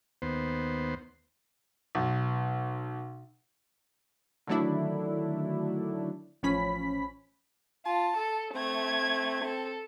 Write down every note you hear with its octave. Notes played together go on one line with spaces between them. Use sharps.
D#2 B3 C5
B1
D3 D#3 F#3 A3 D4 E4
A1 F3 C#4 B5 B6
F4 A5
A4
A3 C4 G#6
A4